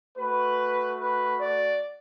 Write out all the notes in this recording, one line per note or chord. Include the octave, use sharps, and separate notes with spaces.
A3 F#4 B4
B4
D5